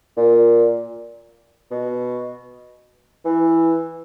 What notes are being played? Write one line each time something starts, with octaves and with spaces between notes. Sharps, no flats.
A#2
B2
E3